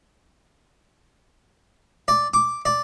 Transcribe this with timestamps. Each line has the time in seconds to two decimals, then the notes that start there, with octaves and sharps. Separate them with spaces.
2.08 D5
2.34 D6
2.65 D5